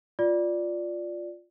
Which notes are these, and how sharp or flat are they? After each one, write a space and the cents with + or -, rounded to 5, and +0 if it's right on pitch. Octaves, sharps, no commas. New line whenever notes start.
F4 +5 D5 +0